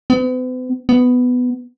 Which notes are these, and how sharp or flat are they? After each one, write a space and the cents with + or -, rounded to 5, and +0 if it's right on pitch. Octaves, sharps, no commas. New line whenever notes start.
B3 +45
B3 +10